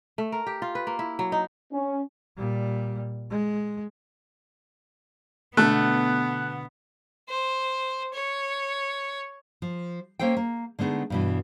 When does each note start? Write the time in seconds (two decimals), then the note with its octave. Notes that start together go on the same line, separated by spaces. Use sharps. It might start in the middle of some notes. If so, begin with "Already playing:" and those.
0.18 A3
0.32 A#4
0.47 G4
0.62 F4
0.75 B4
0.87 A#3
0.99 E4
1.19 F#3
1.32 D#4
1.72 C#4
2.37 A#2 G3
3.31 G#3
5.57 B2 D3 A3 B3 F#6
7.29 C5
8.14 C#5
9.62 F3
10.19 A#3 C#4 A4 C5 G5
10.37 A#3
10.79 D3 G#3 A3 B3 D#4
11.10 G2 B2 E3